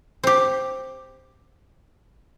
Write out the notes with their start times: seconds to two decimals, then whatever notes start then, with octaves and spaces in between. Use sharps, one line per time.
0.24 C4 G4